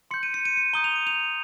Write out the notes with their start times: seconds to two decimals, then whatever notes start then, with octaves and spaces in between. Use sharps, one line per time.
0.11 C6 G6 C#7
0.23 D#7
0.34 C#7
0.45 D#7
0.57 C#7
0.73 A#5 D#6 G6 G7
0.84 F7
0.96 D#7
1.07 F7